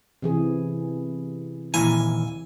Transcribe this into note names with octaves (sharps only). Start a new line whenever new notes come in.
C3 E3 G#4
D#2 A#2 E3 E4 G#5